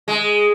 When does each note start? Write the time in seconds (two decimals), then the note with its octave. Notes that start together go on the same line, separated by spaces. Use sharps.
0.08 G#3